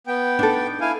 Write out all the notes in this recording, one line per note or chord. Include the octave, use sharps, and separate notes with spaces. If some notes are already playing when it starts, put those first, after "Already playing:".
B3 G5
D4 D#4 A4
E4 F5 G#5